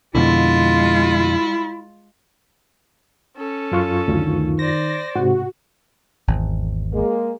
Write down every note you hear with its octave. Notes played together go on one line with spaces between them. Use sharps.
F2 B2 D3 G#3 E4 F4
C#4 A4
F#2 F4 C#6
D2 D#3
C5 D5 A#6
G#2 C3 F#4
G#1 E2
G#3 A#3